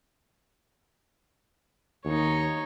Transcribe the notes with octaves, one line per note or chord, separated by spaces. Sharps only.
D#2 D#4 C#5